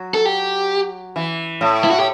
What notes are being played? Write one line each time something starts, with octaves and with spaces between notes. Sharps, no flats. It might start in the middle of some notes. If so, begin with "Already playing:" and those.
Already playing: F#3
A4
G4
E3
A2
E4
F#4
G4